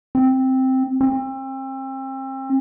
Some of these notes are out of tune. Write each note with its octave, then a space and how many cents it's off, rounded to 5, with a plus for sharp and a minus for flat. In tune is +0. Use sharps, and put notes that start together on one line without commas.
C4 +0
C4 +35